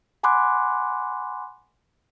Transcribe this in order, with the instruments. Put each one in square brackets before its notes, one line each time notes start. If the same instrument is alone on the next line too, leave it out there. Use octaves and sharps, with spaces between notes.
[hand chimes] F#5 G#5 B5 C6 D6 F#6